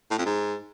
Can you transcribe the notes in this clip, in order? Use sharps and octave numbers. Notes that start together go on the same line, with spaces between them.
A2
F2
G#2